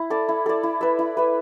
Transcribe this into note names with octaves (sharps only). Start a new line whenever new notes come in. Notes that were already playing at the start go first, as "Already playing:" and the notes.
Already playing: E4
A4 D5
E4
A4 D5
E4
B4 E5
E4
B4 E5